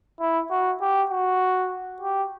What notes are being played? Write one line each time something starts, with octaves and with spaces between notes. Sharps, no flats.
E4
F#4
G4
F#4
G4